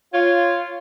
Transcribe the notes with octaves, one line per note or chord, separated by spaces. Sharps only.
F4 C#5